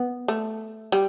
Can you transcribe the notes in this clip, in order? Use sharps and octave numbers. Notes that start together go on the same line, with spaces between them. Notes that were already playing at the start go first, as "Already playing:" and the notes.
Already playing: B3
A3
G3